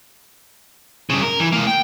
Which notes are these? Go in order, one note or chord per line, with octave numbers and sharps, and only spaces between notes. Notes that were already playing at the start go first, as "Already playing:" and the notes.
G2 C#3
A#4
E3
G#3 A#3
G5